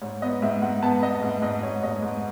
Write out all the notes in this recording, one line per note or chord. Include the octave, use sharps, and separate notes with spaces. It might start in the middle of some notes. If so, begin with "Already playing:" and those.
G#2 C#5
B3 D#5
G#2 E5
G#2 F#5
B3 A5
B3 D#5
G#2
G#2 D#5
G#2 C#5
G#2 D#5
G#2